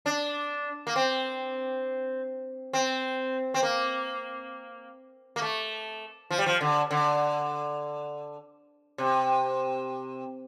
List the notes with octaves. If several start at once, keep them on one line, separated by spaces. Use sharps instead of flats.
D4
A#3
C4
C4
C4
A#3
A#3
A3
F3
G3
F3
D3
D3
C3